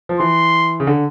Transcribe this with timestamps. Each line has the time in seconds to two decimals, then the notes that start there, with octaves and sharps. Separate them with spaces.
0.09 F3
0.20 E3 C6
0.80 C#3
0.87 D3